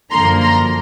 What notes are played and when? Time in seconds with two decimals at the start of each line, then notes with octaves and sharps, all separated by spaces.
0.11 F#2 D3 F3 A#3 A#5 C6
0.41 A#5 C6